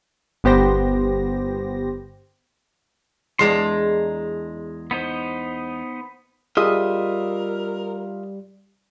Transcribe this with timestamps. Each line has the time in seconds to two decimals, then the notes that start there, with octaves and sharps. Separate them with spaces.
0.44 G1 B3 G4 C5 A#6
3.39 E2 G#3 D4 A#5 C6
4.91 B3 D#4 C5
6.57 G3 F4 G#4 A#4 D#5 E5 D#6